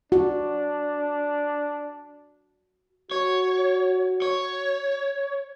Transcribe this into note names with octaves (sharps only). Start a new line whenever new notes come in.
D4 F#4
F#4 C#5
C#5